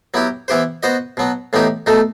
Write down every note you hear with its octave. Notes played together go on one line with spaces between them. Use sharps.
F#3 B3 E4 G4
E3 B3 E4 G4 C5
B3 F#4 C5 D#5
B2 F#3 B3
A2 E3 B3 D#4 G4
B2 A3 D#4 A4